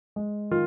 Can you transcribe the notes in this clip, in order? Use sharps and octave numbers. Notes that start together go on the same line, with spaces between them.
G#3
D#3 F4